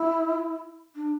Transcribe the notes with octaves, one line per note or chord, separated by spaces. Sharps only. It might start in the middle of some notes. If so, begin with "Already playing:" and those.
Already playing: E4
D4